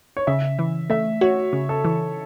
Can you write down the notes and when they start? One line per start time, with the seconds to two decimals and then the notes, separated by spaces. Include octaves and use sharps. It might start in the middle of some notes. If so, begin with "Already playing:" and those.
0.17 C#5
0.27 C#3 E5
0.59 E3
0.90 A3 E5
1.21 F#4 C#5
1.53 C#3
1.69 A4
1.85 E3